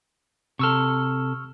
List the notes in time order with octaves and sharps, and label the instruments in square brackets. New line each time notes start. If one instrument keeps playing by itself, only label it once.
[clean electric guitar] C3 A4 [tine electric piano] C#6 E6 F6